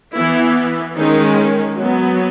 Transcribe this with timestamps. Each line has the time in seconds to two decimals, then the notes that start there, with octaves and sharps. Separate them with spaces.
0.14 E3 B3 E4
0.96 D#3 G#3 C#4 D#4
1.78 F#3 B3